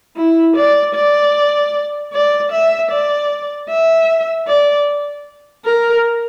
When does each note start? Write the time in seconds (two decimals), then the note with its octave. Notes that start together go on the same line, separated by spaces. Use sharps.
0.17 E4
0.56 D5
0.95 D5
2.13 D5
2.52 E5
2.91 D5
3.70 E5
4.47 D5
5.66 A#4